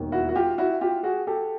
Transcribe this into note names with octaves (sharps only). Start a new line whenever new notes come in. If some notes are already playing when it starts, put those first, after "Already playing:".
Already playing: E1 D#2 D#3
E4 F#4
F#4
F4 G4
E4 F#4
F4 G4
F#4 G#4
G4 A4